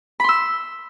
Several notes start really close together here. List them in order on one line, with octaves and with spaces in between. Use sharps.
B5 C6 E6